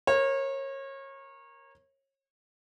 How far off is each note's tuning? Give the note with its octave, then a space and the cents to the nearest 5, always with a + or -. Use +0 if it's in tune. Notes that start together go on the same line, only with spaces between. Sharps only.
A#4 +10 C#5 -30